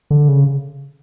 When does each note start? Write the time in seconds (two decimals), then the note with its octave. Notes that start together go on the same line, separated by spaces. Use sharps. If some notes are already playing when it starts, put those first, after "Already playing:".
0.10 D3
0.28 C#3